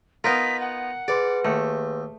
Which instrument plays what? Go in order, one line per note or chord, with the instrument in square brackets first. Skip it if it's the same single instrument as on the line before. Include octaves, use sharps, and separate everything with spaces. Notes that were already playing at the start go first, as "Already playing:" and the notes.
[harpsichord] B3 D#4 F4 [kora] A#4 D#5 [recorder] B6
[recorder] F#5
[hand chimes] G#4 B4 C6 [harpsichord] D5
[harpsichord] D#2 [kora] A3